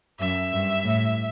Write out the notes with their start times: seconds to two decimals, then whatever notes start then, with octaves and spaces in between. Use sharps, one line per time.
0.19 F#2 E5
0.53 G2
0.84 A2